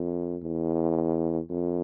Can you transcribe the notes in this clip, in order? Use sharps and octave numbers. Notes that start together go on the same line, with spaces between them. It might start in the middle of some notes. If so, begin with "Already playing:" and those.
Already playing: F2
E2
F2